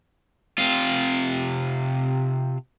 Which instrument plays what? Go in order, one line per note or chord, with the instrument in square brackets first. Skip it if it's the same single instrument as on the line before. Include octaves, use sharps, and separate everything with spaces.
[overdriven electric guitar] C3 F4